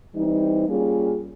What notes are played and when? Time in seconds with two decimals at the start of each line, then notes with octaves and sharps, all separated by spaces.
0.15 E3 G3 C4 D#4
0.67 G3 A#3 C#4 F4 G#4